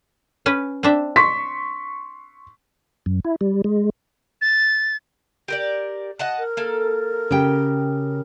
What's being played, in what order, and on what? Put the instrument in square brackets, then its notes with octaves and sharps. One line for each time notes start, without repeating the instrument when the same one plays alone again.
[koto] C#4 B4
C4 D4 E5
[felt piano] C6 C#6 B6
[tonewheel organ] F#2
E4
G3
G#3
[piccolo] A6
[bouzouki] G4 A#4 D5
D#5 F#5 A5
[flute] A#4
[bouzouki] A#3 A4
[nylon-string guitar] C#3 G4 G5